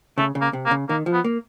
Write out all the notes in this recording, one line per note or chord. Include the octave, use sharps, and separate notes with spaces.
C#3 A3
C#3
A#3
C3
A#3
C#3
D#3 A#3
F3
B3
A#3